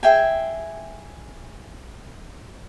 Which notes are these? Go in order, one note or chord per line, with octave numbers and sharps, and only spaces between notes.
G#4 E5 G5 G#5